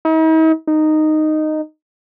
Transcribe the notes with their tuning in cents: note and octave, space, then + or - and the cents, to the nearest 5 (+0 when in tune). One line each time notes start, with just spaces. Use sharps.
D#4 +45
D#4 -10